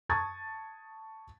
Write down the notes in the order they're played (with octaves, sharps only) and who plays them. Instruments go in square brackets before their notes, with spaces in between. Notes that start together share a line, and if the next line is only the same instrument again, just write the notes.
[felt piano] A5 C#6 D#6 G#6 A6